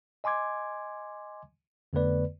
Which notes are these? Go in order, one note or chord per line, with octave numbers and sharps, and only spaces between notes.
D#5 G#5 C6 D6 G#6
F2 D3 A3 B3 B4 D5